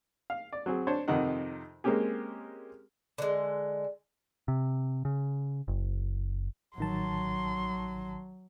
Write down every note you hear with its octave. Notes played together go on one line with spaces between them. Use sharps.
F5
D5
F#3 C4 G#4
D4 C5 C#5
F2 C3 D#3 D#4 F#5
G#3 A#3 C4 C#4 G4 G#4
D3 G#3
C3
C#3
F#1
A1 D#3 F#3 A5 C6